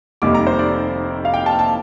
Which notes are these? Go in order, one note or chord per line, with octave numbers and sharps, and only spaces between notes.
F1 D#2 D#3 G3 D6
A#5
C5
D5
F5
G5
A5
A5